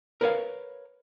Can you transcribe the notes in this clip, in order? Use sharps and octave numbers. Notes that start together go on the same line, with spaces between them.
A#4 B4 C#5 F5